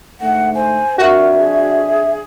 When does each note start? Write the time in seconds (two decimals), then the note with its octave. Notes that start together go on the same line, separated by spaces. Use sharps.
0.20 G#2 D3 A3 F#5
0.55 C5 G#5
0.98 F2 D4 F#4 A#4 E5
1.39 G#4